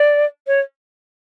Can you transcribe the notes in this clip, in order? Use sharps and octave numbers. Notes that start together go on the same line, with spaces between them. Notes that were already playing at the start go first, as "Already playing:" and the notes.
Already playing: D5
C#5